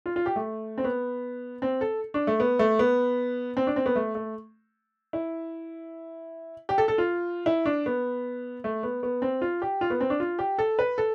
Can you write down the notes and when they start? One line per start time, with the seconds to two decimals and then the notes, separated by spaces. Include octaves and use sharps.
0.06 F4
0.16 F4
0.26 G4
0.36 A3
0.78 C4
0.84 B3
1.62 C4
1.81 A4
2.14 D4
2.27 A3
2.40 B3
2.59 A3
2.79 B3
3.57 C4
3.67 D4
3.76 C4
3.86 B3
3.96 A3
4.15 A3
5.13 E4
6.69 G4
6.78 A4
6.88 A4
6.98 F4
7.46 E4
7.66 D4
7.86 B3
8.64 A3
8.83 B3
9.03 B3
9.22 C4
9.42 F4
9.62 G4
9.81 F4
9.90 B3
10.00 C4
10.10 D4
10.20 F4
10.39 G4
10.59 A4
10.79 B4
10.98 A4